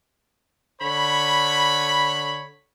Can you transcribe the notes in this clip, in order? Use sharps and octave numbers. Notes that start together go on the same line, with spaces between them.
D3 C#5 B5